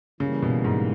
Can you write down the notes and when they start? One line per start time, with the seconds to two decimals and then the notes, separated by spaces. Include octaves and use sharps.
0.20 C#3 E3 G3 A#3
0.42 B2
0.64 G#2